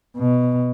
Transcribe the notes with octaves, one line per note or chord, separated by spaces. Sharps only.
B2